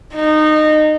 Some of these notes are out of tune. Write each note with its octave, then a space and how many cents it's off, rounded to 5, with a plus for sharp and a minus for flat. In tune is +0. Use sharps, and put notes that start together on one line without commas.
D#4 -20